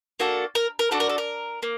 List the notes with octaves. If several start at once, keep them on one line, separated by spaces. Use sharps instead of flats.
A#3 D4 F#4 A4
A#4
A#4
D4 F#4 A4
A#4
A4
A#4
A#3